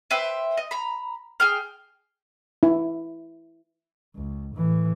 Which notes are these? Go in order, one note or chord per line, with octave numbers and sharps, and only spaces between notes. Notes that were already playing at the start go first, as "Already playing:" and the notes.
B4 C5 E5 G5
D#5
A#5 B5
G#4 G5 F6
E4
C#2
A2 E3